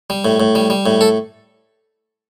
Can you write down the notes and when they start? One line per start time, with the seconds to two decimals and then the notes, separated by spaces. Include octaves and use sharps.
0.10 G3
0.25 A2
0.40 A2
0.55 G3
0.70 G3
0.86 A2
1.01 A4